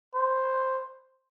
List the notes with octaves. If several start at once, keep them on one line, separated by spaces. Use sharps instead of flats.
C5